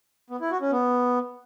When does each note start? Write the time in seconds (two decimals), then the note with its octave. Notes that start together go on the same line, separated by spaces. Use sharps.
0.30 B3
0.41 E4
0.51 F#4
0.61 C#4
0.72 B3